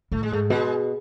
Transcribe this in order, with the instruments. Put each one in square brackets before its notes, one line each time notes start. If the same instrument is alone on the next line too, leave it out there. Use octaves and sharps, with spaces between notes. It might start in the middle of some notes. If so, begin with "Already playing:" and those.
[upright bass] A2 [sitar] A3
[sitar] G#3
[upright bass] G#2 [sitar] A3
[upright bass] B2 [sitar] G#3